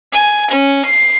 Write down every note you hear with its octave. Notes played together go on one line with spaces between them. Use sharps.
G#5
C#4
C7